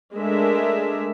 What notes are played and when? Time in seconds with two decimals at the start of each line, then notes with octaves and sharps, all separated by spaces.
0.14 G#3 A3 D4 A#4 E5